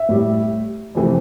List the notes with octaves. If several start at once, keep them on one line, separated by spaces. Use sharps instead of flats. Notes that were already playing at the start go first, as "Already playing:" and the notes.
Already playing: E5
A2 G3
F2 C3 E3 A3